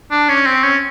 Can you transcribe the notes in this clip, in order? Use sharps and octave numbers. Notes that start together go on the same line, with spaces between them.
D4
C#4
C4
C#4